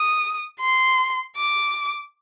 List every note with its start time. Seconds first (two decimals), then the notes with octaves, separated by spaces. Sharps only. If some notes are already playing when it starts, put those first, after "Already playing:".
Already playing: D#6
0.60 C6
1.37 D6